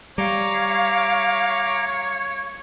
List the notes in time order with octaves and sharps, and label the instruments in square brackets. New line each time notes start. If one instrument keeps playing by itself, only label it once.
[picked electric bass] G3 [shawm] C#5 [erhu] F5 [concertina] A#5 D6